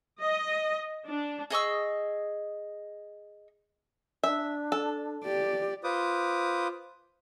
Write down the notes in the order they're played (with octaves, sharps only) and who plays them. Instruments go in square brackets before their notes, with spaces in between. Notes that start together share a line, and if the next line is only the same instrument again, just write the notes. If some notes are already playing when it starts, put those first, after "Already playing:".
[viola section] D#5
D4
[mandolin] G#4 D#5 C#6 E6
[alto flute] D4 [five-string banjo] E5
[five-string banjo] A4
[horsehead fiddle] G4 D5
[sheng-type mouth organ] F4 B4 C5 D6 D#6